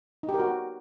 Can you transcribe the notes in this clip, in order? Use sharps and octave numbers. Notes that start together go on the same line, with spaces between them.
D#4
G4
A#4
F#4